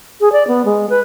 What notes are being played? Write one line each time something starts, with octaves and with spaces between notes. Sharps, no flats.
G#4
D5
B3
G#3
B4